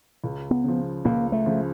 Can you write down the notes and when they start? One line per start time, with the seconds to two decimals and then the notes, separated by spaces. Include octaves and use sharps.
0.24 C#2
0.51 B3
0.64 C#3 F3
1.05 C#2 A#3
1.32 A3
1.46 C#3 F3